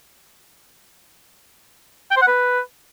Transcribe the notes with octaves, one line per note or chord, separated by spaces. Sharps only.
G5
C5
F#5
B4